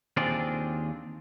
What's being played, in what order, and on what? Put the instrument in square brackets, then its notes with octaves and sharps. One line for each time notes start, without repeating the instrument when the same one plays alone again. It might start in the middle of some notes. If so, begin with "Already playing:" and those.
[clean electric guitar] D#2 C4 D4 F4 G#4 D5